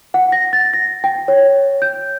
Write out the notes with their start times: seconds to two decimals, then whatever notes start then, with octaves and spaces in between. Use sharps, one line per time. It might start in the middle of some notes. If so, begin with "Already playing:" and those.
0.14 F#5
0.32 A#6
0.53 A6
0.73 A#6
1.04 G5
1.28 C#5
1.82 G6